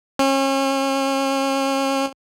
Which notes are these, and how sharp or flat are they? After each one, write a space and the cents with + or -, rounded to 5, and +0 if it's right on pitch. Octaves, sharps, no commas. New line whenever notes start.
C#4 -35